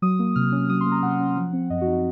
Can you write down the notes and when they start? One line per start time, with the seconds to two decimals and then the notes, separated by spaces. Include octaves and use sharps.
0.02 F#3 D#6
0.19 A#3
0.36 C3 F6
0.52 C#4
0.70 F#3 D#6
0.81 C6
0.86 A#3
0.92 A#5
1.03 C3 F#5
1.20 C#4
1.37 F3
1.53 C4
1.70 F#2 D#5
1.81 F#4
1.87 D#4
1.93 F#4